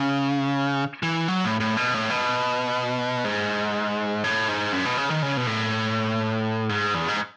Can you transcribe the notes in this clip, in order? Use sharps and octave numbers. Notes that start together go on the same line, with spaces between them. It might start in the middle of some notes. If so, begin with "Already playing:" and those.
Already playing: C#3
E3
F#3
A2
A2
B2
A2
B2
G#2
A2
G#2
F#2
B2
C#3
D#3
C#3
B2
A2
G#2
E2
G#2